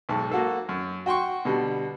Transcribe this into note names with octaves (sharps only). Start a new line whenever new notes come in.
B1 G#2 A5
A#3 F#4 A4
F#2
F#4 G5 C6 C#6
B2 D3 G3